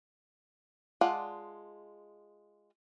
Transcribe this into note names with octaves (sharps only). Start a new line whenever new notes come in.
G#3 F4 D5 F#5 A5